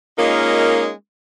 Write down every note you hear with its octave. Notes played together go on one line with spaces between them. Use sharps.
G#3 A#3 C#4 D#4 F4 A#4